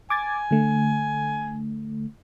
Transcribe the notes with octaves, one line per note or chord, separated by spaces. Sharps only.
G#5 D6 G#6 A6
D3 A3